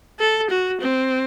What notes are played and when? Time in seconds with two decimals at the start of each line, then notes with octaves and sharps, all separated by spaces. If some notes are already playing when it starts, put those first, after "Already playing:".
0.20 A4
0.50 F#4
0.80 C4